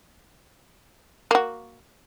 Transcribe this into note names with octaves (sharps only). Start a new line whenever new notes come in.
A#3 F#4